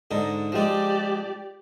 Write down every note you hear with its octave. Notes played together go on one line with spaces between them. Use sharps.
G#2 D3 D#4
F3 G#3 G4 D5